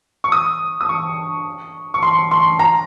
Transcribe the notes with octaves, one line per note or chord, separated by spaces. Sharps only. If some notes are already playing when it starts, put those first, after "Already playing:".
C#6
D#6
D#6
C#6
C#6
C6
C6
A#5